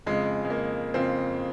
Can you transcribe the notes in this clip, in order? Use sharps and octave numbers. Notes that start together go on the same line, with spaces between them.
F2 C#3 G#3
G#3
A#3
F2 C#3 C4